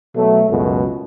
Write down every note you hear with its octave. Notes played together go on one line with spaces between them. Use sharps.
B2 F#3 A3
C#2 F#2 B2 G#3